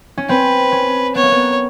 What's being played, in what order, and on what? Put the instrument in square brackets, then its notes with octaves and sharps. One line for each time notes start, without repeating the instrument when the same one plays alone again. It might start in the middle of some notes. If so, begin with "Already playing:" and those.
[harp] C#4
[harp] C4 [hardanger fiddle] B4
[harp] C#4
[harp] B3 [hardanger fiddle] C#5
[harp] A#3
B3